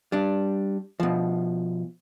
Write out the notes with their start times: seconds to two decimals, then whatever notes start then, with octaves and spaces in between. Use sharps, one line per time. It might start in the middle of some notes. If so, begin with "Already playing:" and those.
0.12 G3 D4
1.00 B2 F3